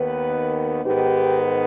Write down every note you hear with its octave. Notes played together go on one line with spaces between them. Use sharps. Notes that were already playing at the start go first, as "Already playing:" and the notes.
Already playing: D#2 D#3 B3 B4
G#2 D#3 B3 G4